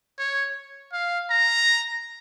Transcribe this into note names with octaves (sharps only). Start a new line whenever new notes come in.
C#5
F5
A#5